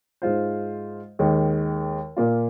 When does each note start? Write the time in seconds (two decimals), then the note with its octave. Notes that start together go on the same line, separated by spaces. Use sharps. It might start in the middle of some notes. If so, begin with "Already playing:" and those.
0.22 G#2 G#3 F4 C5
1.19 D#2 D#3 G#3
2.17 A#2 A#3 F4